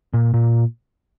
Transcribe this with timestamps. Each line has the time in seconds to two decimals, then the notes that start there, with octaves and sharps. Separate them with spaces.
0.14 A#2
0.34 A#2